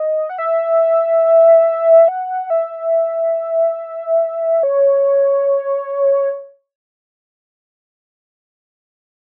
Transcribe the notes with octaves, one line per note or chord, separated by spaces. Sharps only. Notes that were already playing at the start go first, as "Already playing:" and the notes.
Already playing: D#5
F#5
E5
F#5
E5
C#5